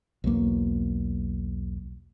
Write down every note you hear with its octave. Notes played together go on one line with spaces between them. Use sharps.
B1 E2 F#3 A#3